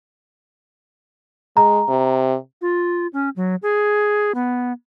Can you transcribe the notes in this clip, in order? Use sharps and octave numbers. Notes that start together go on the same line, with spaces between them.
G#3 A#5
C3
F4
C#4
F#3
G#4
B3